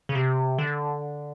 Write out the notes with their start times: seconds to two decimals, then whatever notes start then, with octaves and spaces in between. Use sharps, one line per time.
0.09 C#3
0.15 C3
0.58 D3